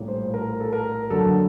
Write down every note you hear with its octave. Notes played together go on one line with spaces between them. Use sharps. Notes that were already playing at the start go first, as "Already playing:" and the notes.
Already playing: A#1 A2 G3 A#3
C5
A#4
A4
A#4
F#1 F#2 D3 F#3 A4